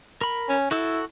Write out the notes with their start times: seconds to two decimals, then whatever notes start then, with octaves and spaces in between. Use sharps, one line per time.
0.21 A#4 B5
0.49 C#4
0.71 E4 F#4 A4 E6